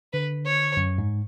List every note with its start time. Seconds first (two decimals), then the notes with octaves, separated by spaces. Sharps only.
0.13 D3 B4
0.45 C#5
0.77 F#2
0.98 G#2